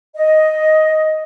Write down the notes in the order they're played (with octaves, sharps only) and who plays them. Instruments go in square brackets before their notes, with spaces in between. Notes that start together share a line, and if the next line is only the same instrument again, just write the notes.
[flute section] D#5